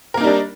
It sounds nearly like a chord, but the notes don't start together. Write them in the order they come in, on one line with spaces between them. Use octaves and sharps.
A#4 A#3 D#4 G3 D4